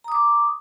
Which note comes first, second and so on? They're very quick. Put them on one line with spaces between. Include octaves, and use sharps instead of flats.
A#5 D#6 D6